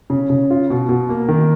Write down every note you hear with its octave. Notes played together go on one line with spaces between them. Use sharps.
C#3
C#3
F4
B2
B2
A#3
D#3